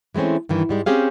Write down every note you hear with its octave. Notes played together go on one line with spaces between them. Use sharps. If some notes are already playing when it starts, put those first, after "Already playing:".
E3 G#3 A3 C4 C#4
G2 D#3 E3
G#2 G3 G#3
C4 C#4 G4 G#4 F5